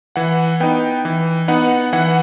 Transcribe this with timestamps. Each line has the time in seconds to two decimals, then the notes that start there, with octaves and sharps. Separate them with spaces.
0.16 E3 F#5
0.60 B3 D#4 G5
1.05 E3
1.48 B3 D#4 F#5
1.93 E3 F#5